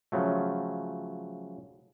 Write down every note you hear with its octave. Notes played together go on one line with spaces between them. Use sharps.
C#3 F3 F#3 A3